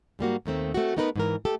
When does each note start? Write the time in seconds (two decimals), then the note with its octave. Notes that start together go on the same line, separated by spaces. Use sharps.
0.19 G#2 G3 A#3 F#4
0.46 D#2 D#3 A3 C4
0.74 A3 C4 F#4
0.97 A3 B3 D#4 E4 A#4 B4
1.16 G#2 E3 A#4
1.45 A3 G4 A4